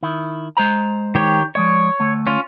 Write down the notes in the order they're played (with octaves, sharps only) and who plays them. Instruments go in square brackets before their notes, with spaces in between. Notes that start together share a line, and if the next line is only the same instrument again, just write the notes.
[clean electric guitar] D#3 E4
G#3 C5 A#5
[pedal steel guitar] D#3 G4 C#5
[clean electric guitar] F3 G#3 D5 [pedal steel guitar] C#5
[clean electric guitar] D2 A3
[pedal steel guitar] C#4 F4